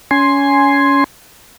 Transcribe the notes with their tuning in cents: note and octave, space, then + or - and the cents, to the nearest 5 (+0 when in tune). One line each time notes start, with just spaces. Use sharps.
C#4 +25 G#5 +0 C6 +5